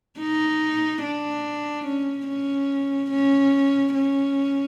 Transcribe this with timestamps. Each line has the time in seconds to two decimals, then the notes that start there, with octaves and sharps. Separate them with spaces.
0.20 D#4
1.03 D4
1.86 C#4
2.27 C#4
3.10 C#4
3.94 C#4